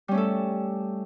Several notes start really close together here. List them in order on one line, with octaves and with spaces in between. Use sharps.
G3 C#4 A3 A4